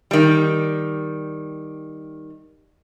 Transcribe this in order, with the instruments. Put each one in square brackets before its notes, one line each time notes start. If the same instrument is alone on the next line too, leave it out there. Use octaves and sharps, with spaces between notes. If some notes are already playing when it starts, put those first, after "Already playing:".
[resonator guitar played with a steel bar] D#3 G3